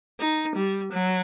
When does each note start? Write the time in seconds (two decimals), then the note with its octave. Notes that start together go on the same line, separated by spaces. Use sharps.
0.20 D#4
0.56 G3
0.92 F#3